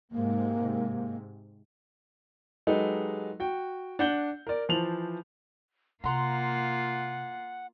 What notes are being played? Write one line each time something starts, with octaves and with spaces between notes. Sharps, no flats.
G#2 C3 A#3
F#3 G#3 D#4 G4 A4 B4
F#4 G5
D4 F#5 G6 G7
A#4 D5
E3 F3 C5 A5 F7 F#7
C3 A#3 F4 F#5 A#5 C6